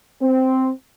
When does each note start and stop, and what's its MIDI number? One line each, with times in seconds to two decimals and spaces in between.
0.22 0.70 60